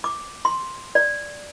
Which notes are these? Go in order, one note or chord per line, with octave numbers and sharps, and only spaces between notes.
D6
C6
D5